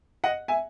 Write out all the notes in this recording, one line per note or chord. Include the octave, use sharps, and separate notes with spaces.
D#5 F#5
E5 G#5